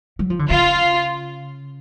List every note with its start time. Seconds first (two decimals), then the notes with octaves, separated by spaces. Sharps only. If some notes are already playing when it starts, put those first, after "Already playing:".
0.19 F#3
0.30 F3
0.39 D3
0.50 C#3 F4